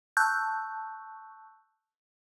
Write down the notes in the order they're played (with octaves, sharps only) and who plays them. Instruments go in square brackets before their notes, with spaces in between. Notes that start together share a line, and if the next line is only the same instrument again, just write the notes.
[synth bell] A5 C#6 E6 F#6 G6